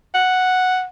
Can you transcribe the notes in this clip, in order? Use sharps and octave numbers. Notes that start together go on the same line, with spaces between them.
F#5